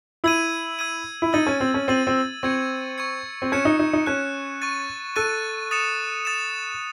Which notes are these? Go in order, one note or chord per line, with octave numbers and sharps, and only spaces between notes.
E4 E6 G#6 D#7
E6 G#6 D#7
E4
D#4 E6 A6 D#7
C#4
C4
C#4
C4 E6 A6 D#7
C4
C4 C#6 G#6 C#7
C#6 G#6 C#7
C4
C#4 F#6 C#7 E7
D#4
D#4
D#4
C#4 F#6 C#7 E7
C#6 F#6 A6 D#7
A4 C#6 F#6 A6 D#7
D#6 A6 C#7 E7
D#6 A6 C#7 E7